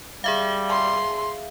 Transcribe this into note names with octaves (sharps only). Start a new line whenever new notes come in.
G3 G#4 E5 F5
C6